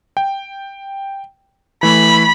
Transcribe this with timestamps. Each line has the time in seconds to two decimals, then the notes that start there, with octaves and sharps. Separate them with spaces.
0.17 G5
1.83 E3 A3 B5